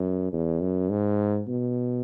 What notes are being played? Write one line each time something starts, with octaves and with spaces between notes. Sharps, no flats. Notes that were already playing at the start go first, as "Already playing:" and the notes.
Already playing: F#2
E2
F#2
G#2
B2